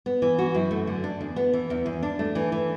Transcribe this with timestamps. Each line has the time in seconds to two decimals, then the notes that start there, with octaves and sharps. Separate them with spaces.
0.06 B3
0.22 E3
0.39 F#4
0.55 F#2
0.71 A3
0.87 D3
1.04 D4
1.21 E2
1.36 B3
1.53 E3
1.70 E2
1.86 E2
2.03 D4
2.19 A3
2.35 E3
2.52 E3